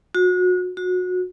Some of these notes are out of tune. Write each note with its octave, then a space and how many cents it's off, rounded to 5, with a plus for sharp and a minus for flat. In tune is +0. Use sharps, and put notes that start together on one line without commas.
F#4 -30
F#4 -25